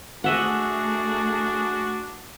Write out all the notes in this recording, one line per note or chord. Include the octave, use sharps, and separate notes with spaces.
A3 D4 F#4 G#4 D#5 E5 F#5